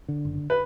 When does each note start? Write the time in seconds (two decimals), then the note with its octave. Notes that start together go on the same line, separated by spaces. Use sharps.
0.08 D3
0.25 F#1
0.50 B4